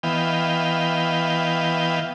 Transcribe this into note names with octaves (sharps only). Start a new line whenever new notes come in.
E3 B3 D#5 F5 G5